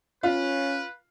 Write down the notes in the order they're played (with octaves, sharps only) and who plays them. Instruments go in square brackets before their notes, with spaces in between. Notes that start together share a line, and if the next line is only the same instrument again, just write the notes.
[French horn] C#4 [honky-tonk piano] F4 [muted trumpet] B4